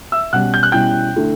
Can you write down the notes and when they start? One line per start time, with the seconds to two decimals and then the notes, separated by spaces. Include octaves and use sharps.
0.12 E5 E6
0.33 B2 G3 C#4 F#5 F#6
0.54 G6
0.63 F#6
0.72 B2 G3 C#4 E4 G5 G6
1.16 D3 A3 E4